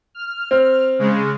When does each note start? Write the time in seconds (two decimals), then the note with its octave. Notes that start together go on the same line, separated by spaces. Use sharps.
0.15 F6
0.51 C4
0.99 C#3 G#3